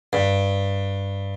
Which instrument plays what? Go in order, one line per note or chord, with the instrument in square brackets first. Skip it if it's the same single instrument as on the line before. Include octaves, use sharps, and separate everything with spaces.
[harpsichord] G2